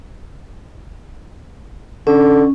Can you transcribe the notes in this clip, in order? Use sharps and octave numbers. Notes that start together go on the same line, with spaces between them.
D3 C#4